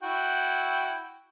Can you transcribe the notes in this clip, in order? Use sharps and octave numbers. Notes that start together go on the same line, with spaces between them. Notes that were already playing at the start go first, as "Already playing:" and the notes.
E4 F#4 G5